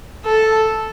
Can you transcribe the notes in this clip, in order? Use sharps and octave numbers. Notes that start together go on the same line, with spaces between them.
A4